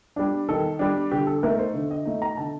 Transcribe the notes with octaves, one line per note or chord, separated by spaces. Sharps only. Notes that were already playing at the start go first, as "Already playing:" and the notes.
G3 D4
D#3 A4
G3 D4
D3 G4
A4
A3 D#4 A#4
C5
D3
D#5
A3 D#4
A#5
D3 A5